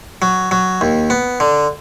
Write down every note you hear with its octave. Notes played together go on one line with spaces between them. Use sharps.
F#3
F#3
D#2
B3
D3